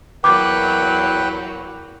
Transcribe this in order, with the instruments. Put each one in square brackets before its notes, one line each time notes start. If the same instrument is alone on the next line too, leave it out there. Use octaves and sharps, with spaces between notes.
[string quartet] E2 F#3 A#3 [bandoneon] B4 G5 [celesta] D6